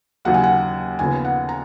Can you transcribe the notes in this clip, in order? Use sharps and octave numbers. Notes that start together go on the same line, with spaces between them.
D#2 C#3 F#3 A#3 F#5
G#5
F#5
D#2 C#3 F3 B3 G#5
F#5
A#5